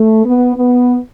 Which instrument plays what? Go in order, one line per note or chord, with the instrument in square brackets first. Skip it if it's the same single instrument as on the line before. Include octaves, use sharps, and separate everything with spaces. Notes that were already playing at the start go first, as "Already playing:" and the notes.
Already playing: [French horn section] A3
B3
B3